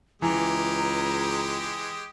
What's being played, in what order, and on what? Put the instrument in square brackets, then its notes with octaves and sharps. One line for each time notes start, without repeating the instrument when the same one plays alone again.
[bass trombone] C#2 [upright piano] E3 [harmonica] G#3 G4 D#6 [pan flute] A#5